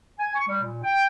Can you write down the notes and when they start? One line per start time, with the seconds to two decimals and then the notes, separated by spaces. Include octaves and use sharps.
0.19 G#5
0.35 C#6
0.47 G3
0.62 A#2
0.82 G5